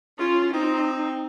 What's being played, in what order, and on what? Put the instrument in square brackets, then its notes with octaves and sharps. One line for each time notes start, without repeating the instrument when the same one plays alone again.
[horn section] C#4 [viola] F4
[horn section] C4 [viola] D#4